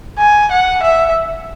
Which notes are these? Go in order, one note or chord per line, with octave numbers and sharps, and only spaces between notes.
G#5
F#5
E5